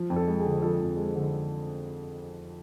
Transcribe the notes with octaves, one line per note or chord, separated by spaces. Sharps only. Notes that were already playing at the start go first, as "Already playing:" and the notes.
Already playing: F3
F2
A4
G#3
G#4
D3
F3 A4
F2
G#3
D3